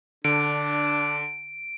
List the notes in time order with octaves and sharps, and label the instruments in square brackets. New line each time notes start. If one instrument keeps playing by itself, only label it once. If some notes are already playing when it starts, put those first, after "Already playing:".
[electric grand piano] D3 [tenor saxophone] D4 [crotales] D7